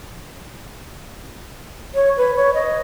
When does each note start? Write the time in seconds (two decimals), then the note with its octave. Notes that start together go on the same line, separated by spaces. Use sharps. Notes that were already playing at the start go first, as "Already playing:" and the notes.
1.94 C#5
2.17 B4
2.35 C#5
2.54 D#5